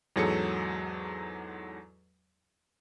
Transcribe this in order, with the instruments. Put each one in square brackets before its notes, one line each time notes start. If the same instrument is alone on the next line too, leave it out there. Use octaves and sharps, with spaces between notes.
[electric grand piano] E2 G#2 F#3 G#4 A4 C#7